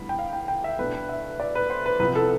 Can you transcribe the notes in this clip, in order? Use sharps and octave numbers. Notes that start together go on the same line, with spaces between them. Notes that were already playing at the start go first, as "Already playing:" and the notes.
Already playing: D2 D3 G3 B3 E4 B5
G5
F5
G5
G5
E5
B2 A3 D4 B4
E5
D5
B4
C5
B4
C2 C3 F3 B3 E4 B4
A4